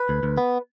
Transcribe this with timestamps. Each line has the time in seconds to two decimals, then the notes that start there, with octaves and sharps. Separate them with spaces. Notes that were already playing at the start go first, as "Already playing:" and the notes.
Already playing: B4
0.09 D2
0.23 D2
0.38 B3